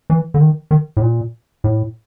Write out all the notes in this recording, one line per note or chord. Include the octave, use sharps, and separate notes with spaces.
E3
D3
D#3
D#3
A2
A#2
A2